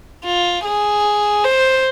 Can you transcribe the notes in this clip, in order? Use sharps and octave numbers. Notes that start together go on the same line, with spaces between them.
F4
G#4
C5